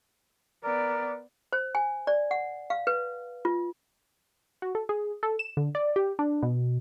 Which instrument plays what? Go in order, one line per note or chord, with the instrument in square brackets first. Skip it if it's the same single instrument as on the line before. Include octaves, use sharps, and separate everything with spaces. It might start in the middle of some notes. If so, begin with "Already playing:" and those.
[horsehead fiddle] B3 D5 [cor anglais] A#4
[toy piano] C5
G#5
D5
F#5
F5
B4
F4
[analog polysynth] F#4
A4
G#4
A4
E7
D3
D5
G4
D4
B2